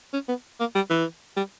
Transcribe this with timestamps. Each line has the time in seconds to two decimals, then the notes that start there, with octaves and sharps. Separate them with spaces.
0.13 C#4
0.29 B3
0.60 A#3
0.75 G3
0.90 E3
1.37 G3